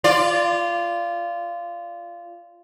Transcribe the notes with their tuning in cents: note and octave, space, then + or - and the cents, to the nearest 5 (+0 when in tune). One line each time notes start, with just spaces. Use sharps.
F4 -15 D5 +0